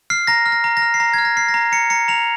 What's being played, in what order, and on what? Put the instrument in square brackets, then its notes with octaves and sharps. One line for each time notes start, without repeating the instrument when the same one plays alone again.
[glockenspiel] F6 C7
A#5 A#6
F6
A#6
A#5
A#6
F6
C7
A#5 A#6
F6 G#6
A#6
F6 C7
A#6
A#5
A#5 C#7
A#5 C#7
A#5 F7